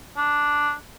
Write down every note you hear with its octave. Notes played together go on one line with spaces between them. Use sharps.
D4